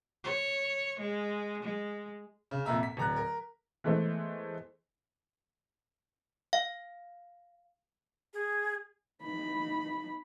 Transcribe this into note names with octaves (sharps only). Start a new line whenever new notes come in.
C#5
G#3
G#3
C#3
F2 A#2 A#3 E5 A#5
B6
D1 A#5 F#6
A#4
E3 G#3 A3 B3 C5
F5
G#4
D#4 B5